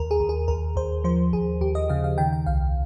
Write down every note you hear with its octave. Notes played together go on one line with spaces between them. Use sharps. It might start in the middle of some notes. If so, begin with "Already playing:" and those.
Already playing: D#2 A#4
G#4
D#2
G#4
D#2 A#4
D#2 C5
F3 C5
D#2 G#4
D#2 G4
D#5
C#3 F5
F5
D#3 G5
G5
C2 F5